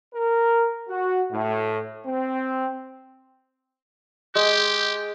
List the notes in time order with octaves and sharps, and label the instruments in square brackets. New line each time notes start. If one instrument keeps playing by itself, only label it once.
[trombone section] A#4
F#4
A2
C4
[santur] G#3 [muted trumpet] G4